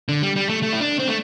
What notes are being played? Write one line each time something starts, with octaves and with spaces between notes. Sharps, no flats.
D3
G3
G3
A3
A3
E4
D4
C4
A3